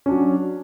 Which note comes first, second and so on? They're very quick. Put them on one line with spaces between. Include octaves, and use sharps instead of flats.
C#4 D4 F#3